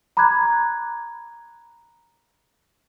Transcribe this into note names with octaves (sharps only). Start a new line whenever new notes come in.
A#5 B5 D6 F#6 G#6